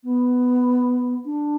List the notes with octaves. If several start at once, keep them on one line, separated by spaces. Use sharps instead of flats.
B3
D4